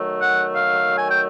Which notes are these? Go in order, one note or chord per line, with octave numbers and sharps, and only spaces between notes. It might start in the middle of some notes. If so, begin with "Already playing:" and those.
Already playing: D#3 F#3 A3
F#5
F5
G#5
G5